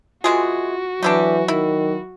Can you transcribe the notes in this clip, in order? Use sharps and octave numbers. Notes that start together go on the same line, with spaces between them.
E3 G#3 F4 F#4 G#4
E3 F#3 D4 E4 G4
D#3 E4